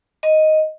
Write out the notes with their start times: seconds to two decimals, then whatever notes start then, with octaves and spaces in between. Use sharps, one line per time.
0.23 D#5